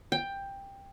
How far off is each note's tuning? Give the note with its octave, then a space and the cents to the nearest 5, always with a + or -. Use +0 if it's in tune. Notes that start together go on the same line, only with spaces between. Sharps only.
G5 +10